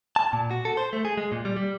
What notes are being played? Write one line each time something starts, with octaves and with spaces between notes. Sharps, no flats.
A5
A#2
F#4
A4
C5
A3
G#4
G#3
A#2
G3
G3